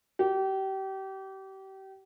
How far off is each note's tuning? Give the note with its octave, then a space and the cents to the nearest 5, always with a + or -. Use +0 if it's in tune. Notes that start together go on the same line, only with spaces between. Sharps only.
G4 -30